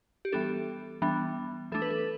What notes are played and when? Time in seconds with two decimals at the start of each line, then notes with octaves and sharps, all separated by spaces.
0.25 G4
0.32 E3 G3 B3 D4 A4
1.02 E3 G3 B3 D4
1.72 E3 A3 D4 A4
1.82 B4
1.90 A4